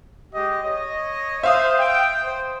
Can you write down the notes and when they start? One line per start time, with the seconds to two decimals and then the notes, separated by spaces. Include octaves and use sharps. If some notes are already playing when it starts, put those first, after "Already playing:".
0.34 G#3 G4 D#5
0.64 C#5 D#5
1.43 C5 E5 F5 D#6
1.79 G5
2.23 C5